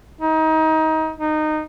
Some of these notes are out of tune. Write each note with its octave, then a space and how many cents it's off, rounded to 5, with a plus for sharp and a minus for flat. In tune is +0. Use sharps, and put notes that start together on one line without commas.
D#4 +25
D#4 -20